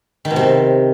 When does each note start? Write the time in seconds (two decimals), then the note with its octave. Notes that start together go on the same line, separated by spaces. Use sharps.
0.25 D#3
0.31 B2
0.36 C3